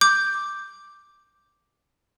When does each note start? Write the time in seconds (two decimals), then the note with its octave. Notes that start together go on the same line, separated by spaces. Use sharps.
0.01 D6 G6